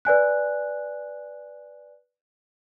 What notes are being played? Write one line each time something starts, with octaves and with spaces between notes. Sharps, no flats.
B4 D5 G#5 F#6